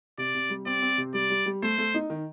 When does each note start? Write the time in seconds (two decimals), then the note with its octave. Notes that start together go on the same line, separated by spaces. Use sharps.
0.18 C3 D5
0.35 C3
0.50 G3
0.66 C4 D5
0.82 C4
0.98 C3
1.14 G3 D5
1.30 G3
1.46 G3
1.62 A3 C5
1.78 A3
1.94 D#4
2.10 D#3